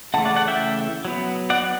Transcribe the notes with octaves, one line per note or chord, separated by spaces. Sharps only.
C#3 E3 A3 F#5 A5
D5 F#5
D5 F#5
E5 G5
F#3 B3
D5 F#5